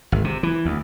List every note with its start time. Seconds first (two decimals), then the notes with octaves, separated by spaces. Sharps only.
0.12 G#1
0.24 C3
0.43 E3
0.65 D2